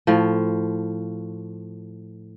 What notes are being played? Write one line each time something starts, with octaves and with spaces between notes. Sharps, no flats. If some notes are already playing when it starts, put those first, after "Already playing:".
A2 F3